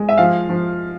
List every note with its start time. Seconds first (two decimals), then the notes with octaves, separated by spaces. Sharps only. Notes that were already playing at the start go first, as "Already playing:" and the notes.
Already playing: G#3
0.09 E5
0.18 F3 F5
0.49 F3